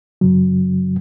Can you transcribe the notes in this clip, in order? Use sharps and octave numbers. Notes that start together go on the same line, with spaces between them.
F#2 C#3 F#3